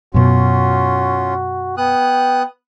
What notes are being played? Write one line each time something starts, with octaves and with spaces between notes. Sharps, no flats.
F#2 B2 C#4 F4 F#4
B3 G5 D#6 F#6